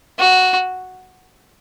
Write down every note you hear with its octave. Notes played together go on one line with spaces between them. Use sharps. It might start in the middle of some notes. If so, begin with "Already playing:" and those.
F#4